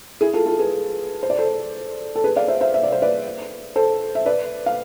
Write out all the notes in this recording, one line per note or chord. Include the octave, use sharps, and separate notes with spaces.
E4 G#4
F4 A4
F4 A4
G#4 B4
C5
D5
A4 C5
A4
G#4 B4
D5 F5
C5 E5
C5 E5
E5
D5
C5
B4 D5
A4 C5
E5
B4 D5
F5